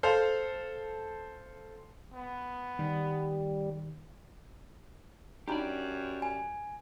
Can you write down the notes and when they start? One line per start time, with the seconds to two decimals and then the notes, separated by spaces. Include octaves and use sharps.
0.03 A4 C5 F5
2.14 B3
2.79 D#3 G3
5.48 F#2 D4 D#4 G4 D5 B5
6.22 G#5